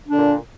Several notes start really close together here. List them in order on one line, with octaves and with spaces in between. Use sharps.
D4 D3 A#2